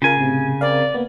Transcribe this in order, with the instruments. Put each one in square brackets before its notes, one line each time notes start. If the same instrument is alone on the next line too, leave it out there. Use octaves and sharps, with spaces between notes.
[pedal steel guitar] C#3 G#5 [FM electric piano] F4 A#4
[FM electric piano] A2 C3
[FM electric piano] C4 A#4 F5 [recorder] D5
[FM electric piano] A#3 B3